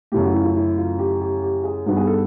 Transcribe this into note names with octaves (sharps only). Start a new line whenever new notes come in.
F#2 C#3 E3 A3 G4
F#4
E4
F4
E4
E4
F4
G4
G4
G4
G#4
G2 D#3 G3 B3 F#4
G#4
A4